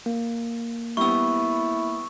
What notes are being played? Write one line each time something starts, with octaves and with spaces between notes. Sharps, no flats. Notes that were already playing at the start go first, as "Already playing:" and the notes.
A#3
G3 B3 E4 C#6 E6